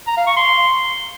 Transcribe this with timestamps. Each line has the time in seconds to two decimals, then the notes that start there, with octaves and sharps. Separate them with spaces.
0.07 A#5
0.17 F5
0.27 C#6
0.37 C6